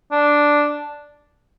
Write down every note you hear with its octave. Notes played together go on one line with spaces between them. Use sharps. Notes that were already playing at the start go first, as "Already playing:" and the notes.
D4